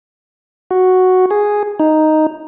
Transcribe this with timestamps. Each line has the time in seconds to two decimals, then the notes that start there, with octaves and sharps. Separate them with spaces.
0.71 F#4
1.31 G#4
1.80 D#4